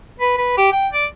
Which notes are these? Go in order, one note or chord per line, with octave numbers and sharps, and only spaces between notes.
B4
B4
G4
G5
D5